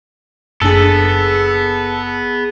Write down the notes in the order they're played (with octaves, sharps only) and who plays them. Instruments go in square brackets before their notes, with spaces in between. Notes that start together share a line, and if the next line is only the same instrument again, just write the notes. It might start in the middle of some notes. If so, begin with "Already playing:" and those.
[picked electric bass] F#1 D4 [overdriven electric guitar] B3 [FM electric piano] G#4 A#6 B6 [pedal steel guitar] A4